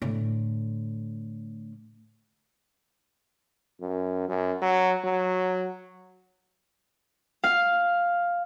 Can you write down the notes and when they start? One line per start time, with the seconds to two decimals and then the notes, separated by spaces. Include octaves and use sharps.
0.02 A2 D3
3.81 F#2
4.28 F#2
4.62 F#3
5.04 F#3
7.44 F5